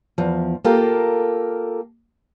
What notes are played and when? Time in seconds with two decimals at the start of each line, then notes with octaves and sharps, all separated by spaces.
0.18 E2 F3
0.64 A#3 F4 G4 A4 A#4